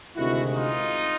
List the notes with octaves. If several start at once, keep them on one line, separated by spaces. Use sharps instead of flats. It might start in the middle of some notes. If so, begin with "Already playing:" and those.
D2 C3 D#3 G#3 E4 F#4
D#4 F4